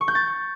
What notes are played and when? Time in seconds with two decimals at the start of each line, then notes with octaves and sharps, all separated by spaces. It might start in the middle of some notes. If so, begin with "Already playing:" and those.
0.01 C#6
0.08 G6
0.15 A6